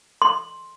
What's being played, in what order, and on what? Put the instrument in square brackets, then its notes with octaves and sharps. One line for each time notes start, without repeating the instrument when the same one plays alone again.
[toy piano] C6